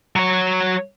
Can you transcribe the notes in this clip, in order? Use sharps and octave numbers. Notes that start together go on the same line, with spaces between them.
F#3 C#5